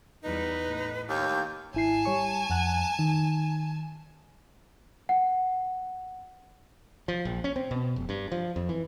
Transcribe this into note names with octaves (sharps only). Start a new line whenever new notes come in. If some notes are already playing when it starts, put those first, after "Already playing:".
E2 G3 D#4 B4
A2
D#2 C#5 G6
G#1 E4 G#5 A5 C7
G3 C#5 C#6
F2 F#5 F#6
D#3
F#5
F3
A#1
C#4
C4
B2
F1
G2
F3
F2
E3